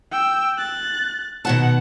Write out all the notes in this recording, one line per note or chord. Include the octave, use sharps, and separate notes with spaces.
G5 E6
F#6 A6
B2 D#3 F#5 A5